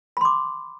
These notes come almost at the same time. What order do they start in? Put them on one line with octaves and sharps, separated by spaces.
B5 C6 D6